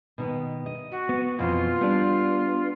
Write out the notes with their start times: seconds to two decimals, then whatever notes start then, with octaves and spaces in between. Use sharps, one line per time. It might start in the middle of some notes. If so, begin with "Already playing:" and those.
0.18 B2 D#3 B3
0.66 D#5
0.91 F#4
1.09 B3
1.38 F2 B2 E3 F4
1.81 G3 B3 D4